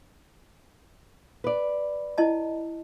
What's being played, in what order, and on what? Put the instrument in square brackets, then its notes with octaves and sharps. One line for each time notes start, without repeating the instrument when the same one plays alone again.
[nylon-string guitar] B4 D5
[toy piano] E4 D#5 A5